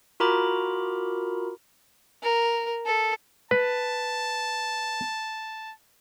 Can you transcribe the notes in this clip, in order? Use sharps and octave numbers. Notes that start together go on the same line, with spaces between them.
F4 F#4 A#4 A#5 B5 D6
A#4
A4
B4 A5